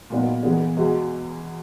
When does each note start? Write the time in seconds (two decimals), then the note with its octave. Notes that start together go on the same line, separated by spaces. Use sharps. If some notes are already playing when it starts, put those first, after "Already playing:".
0.10 A#2 F#3 B3 D#4
0.43 E3 G#3 B3 D#4 G#4
0.77 E2 B2 G#3